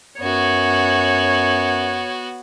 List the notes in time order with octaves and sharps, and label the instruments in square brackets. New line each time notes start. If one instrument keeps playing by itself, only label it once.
[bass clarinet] F#2 [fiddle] B3 F#4 [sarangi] C#5